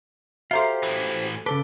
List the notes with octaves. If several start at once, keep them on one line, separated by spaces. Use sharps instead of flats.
F#4 G4 A4 C5 E5 F5 A#5 C6
A2 E3
C#3 A4 B4 A5 D6